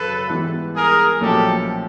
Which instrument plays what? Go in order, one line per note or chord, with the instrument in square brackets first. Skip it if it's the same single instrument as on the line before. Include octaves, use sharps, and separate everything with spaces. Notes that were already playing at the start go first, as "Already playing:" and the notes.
Already playing: [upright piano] G#1 F#2 C#3 [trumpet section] A4 B4
[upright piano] G#2 E3 G3 B3
[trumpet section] G#4 A#4
[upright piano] B1 A#2 F3 A3 C#4 [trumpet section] G4 A4